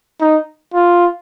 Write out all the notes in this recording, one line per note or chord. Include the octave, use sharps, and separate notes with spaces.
D#4
F4